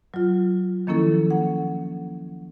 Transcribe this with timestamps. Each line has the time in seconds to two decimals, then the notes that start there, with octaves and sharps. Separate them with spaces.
0.14 F#3 F4
0.87 D#3 F3 A#3 C#4 E4 A4
1.31 F#5